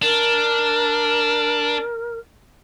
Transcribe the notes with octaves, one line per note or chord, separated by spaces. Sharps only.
D4 A#4